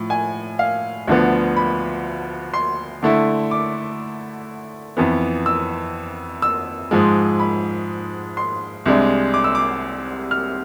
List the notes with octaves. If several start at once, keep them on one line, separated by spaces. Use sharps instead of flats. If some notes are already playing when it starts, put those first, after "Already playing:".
Already playing: A2 F3
G#5
F5
D2 D3 F3 B3
B5
C6
D3 A3 E4
D6
F2 E3 B3
E6
E6
G#2 F3 G#3
B5
C6
C2 C3 G#3 D4
D6
E6
D6
F6